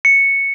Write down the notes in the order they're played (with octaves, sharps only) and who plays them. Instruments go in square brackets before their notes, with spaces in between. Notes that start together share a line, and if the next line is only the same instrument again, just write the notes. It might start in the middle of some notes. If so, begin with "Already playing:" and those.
[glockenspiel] C#7